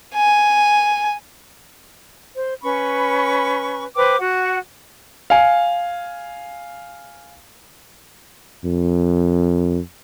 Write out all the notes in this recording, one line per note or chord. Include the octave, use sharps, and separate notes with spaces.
G#5
C5
C#4 B4 B5 C#6
B4 C5 G5 D6
F#4 F#5
F5 G#5
F2